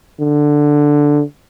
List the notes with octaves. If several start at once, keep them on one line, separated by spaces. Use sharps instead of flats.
D3